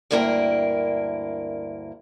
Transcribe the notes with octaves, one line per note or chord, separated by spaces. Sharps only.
D2 G2 A#3 E4 A#4 G5